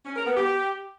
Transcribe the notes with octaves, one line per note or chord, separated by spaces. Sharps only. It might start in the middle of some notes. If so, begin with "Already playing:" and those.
C#4
A#4
B3
G4